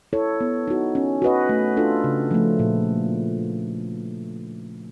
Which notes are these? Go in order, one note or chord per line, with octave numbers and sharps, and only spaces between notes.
E4 A4 C#5
B3
D#4 F#4
C#4
F#4 B4 D#5
A3
D4 F4 A4
C#3
F3 A3
A#2